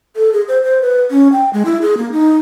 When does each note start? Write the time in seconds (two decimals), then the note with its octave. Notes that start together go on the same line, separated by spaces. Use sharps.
0.16 A4
0.33 G#4
0.48 C5
0.64 C5
0.81 B4
1.11 C#4
1.33 G5
1.53 G#3
1.65 E4
1.82 G#4
1.98 A#3
2.12 D#4